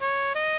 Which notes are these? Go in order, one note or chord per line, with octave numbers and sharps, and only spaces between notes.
C#5
D#5